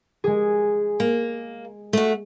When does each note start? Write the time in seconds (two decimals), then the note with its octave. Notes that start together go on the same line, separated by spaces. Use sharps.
0.24 G#3 G#4
1.00 A#3
1.93 A3 F#4